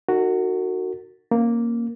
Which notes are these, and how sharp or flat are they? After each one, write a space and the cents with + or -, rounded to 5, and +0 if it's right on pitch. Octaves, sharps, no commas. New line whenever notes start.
D#4 +0 F#4 +0 A#4 -45
A#3 +0 C#4 -20